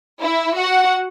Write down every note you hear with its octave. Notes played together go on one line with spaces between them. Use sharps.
E4 E5
F#4 F#5